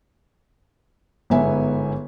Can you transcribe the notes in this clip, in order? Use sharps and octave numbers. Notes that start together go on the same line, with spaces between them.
G1 G#2 B3 E5 G#5